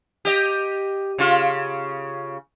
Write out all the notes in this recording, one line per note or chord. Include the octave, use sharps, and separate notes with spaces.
G4 D#5
C#3 F4